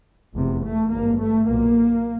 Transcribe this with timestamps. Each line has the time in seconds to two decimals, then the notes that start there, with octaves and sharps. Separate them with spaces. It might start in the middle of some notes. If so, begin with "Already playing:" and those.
0.35 F1 E2 C3
0.63 A3
0.91 G#1 G2 A#3
1.19 A3
1.47 B1 A#2 A#3